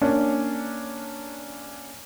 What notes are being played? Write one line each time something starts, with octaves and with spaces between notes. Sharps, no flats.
A#3 C#4 D4